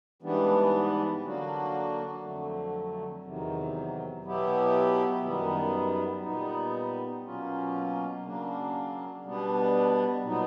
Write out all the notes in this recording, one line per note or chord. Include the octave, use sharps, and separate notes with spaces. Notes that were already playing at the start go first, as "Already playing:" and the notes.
G#2 E3 G3 B3 D4
D3 F#3 A#3 D4 F#4
F2 D3 F#3 A3
E2 C3 D#3 F#3
B2 F#3 B3 E4 G4
F#2 D#3 G3 B3
A#2 G3 B3 D#4
B2 F#3 A#3 C#4 F4
C#3 F#3 A#3 D4
B2 G3 B3 D4
A#2 F#3 B3 D#4